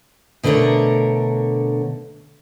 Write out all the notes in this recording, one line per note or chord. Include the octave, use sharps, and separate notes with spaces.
B2 D3 A3 D4 A#4 C#5